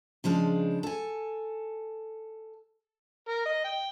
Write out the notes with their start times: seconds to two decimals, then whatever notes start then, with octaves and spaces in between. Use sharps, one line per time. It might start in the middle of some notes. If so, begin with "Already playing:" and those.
0.24 C#3 F3 G#3 D4
0.83 A4 G#5
3.28 A#4
3.45 D#5
3.64 G5